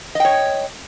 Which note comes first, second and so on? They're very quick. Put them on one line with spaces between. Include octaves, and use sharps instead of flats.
D#5 G5 C#5